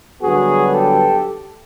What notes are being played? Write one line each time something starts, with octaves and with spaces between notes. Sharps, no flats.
G2 D3 F#3 B3 F#4 G#4
G4 A4